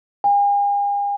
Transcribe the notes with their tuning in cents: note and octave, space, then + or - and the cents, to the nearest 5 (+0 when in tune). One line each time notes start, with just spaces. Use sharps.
G#5 -45